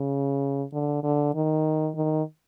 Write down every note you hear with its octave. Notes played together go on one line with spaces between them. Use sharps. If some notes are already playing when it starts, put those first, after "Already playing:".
Already playing: C#3
D3
D3
D#3
D#3